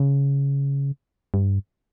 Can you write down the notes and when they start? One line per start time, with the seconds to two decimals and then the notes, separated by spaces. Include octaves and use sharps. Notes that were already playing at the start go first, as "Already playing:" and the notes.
Already playing: C#3
1.34 G2